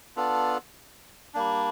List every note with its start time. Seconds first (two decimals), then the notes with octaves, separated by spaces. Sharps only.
0.16 B3 D4 F4 A4
1.34 G3 A#3 D4